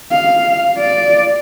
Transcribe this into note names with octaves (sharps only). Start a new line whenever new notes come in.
F5
D5